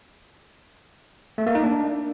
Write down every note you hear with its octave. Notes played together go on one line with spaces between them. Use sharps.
A3
A#3
D#4
D4